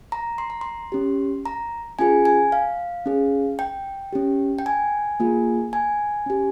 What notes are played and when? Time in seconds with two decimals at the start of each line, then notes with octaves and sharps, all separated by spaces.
0.12 A#5
0.38 C6
0.50 A#5
0.61 C6
0.92 C#4 G4
1.45 A#5
1.99 C#4 F4 G#4 G#5
2.25 G#5
2.52 F5
3.06 C#4 G#4
3.59 G5
4.13 C#4 G4
4.59 G5
4.66 G#5
5.20 A#3 F4 G#4
5.73 G#5
6.26 C#4 G4